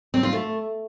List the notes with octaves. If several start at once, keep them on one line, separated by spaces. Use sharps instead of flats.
C4
F4
A3